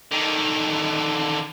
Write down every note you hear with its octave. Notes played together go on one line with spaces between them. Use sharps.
D3 D#3